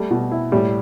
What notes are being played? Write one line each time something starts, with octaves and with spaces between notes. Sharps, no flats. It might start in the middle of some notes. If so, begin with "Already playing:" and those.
Already playing: G3 A3
B2
E4
A2 G3